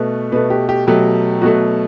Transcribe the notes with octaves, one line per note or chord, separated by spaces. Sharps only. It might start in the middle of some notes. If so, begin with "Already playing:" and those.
Already playing: B2 A3 B4
B2 A3 B4
G4
G4
B2 F#3 A3 G4
B2 F#3 A3 F#4